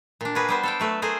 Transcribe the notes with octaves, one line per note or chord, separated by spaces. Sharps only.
A#2 D4
F#4 G#4 A#4 B4
G3 B3 C5
A4 F5 G5
F#3 A3 B4
A3 G#4 A#4 C5